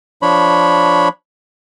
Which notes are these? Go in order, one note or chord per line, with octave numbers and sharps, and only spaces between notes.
F3 D4 C#5 B5